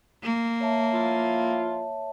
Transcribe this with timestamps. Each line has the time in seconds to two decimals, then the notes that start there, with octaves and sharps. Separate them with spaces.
0.23 A#3
0.60 C#5 E5 A5
0.93 F3 E4 F4